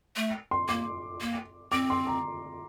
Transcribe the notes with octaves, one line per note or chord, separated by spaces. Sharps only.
A3
C6
A#3 D6
A#3
C4 D6
C6
A#5